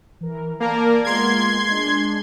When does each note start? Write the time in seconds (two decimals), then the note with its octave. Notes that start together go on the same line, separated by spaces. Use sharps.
0.21 E3 A#4
0.60 A#3 A#4 D5 A5
1.05 G#3 B3 F4 C6 G#6
1.68 G#3 D4